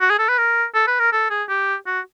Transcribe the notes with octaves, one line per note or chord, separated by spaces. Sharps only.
F#4
G#4
A4
B4
A#4
A4
B4
A#4
A4
G#4
G4
F#4